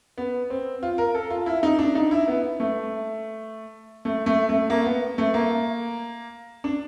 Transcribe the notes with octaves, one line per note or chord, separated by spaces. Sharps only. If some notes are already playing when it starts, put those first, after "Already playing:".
B3
C4
F4
A#4
A4
F4
E4
D#4
D4
D#4
E4
B3
A3
A3
A3
A3
A#3
B3
A3
A#3
D4